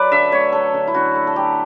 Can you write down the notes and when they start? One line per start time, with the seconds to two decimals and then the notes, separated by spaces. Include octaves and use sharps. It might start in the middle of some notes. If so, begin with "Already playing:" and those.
Already playing: F#3 B4 D5
0.12 D3 E5
0.32 A3 C#5
0.52 F#3 A4
0.74 D3
0.87 E4
0.94 D3 F#4
1.15 A3
1.27 A4
1.36 F#3 G4